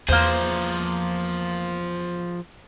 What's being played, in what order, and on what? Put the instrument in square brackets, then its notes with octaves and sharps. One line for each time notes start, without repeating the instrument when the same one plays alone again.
[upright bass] E2 [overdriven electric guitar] F3 G#4 [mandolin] A#3 C5